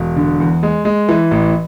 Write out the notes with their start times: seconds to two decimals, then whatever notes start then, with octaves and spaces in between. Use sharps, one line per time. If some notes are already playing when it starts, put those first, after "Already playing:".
Already playing: E1
0.16 D3
0.40 E2
0.63 G#3
0.85 G#3
1.09 E3
1.31 A1